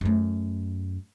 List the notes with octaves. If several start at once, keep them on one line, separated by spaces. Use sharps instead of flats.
F#2 A3